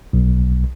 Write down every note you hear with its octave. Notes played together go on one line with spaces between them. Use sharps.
B1